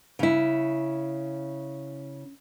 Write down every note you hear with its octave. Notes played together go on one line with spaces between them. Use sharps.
C#3 E4